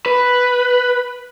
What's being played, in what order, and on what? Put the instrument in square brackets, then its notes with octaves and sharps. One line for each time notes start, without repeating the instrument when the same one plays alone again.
[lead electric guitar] B4